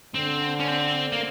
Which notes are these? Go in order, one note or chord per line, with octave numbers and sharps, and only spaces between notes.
D3 C4
C#4
C4
A#3